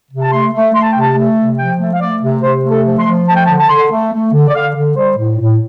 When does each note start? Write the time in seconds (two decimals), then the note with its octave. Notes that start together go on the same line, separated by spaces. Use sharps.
0.11 C3
0.22 A5
0.32 A3 C6
0.53 A3
0.74 A3 C6
0.82 A5
0.91 C3 G5
1.01 A5
1.15 A3
1.37 C3
1.58 F3 G5
1.79 A3
1.93 F5
2.00 A3 D5
2.22 C3
2.43 C3 C5
2.64 A3
2.71 A4
2.86 F3
2.99 C6
3.07 F3
3.27 A3 A5
3.36 G5
3.44 A5
3.49 D3
3.60 A5
3.69 D3 C6
3.91 A3
4.13 A3
4.33 D3
4.47 D5
4.54 D3 F5
4.75 D3
4.96 G3 C5
5.17 A2
5.39 A2